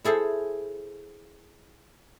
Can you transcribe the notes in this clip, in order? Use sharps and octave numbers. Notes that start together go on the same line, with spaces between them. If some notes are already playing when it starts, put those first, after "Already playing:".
E4 G#4 A4 C5